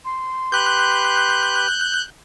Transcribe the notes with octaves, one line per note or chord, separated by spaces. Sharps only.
C6
G4 B4 F#6 G6